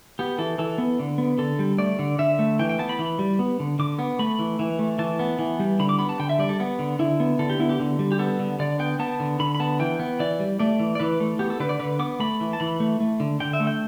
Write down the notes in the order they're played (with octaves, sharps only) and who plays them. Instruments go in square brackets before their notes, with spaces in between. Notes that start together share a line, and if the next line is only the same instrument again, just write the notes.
[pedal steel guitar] B3 G4
E3 A4
E3 A4
B3
D3
B3
D3 A4
G3
A3 D5
D3
D3 E5
A3
E3 G5
G5
B3 A5
B5
E3
G3
B3
D3
D3 D6
B3
A3 B5
E3
E3
A3
E3 A5
B3
E3
G3
D3 B5
D6
B3 B5
A5
D3 G5
E5
G3 D5
A4
B3
D3
D3 E4
B3
D3 A4
G4
B3 E4
G4
D3
G3
G4
B3 A4
D3
D3 D5
B3 G5
B3 A5
D3
D3 B5
B5
B3 A5
E3 G5
B3
E3 D5
G3
A3 D5
E3
D5
E3 B4
A3
B3 G4
A4
D3 B4
D5
D3 B4
B3 D6
A3 B5
E3
A5
E3 B5
A3
A3
D3
D3 G5
E5
A3
G5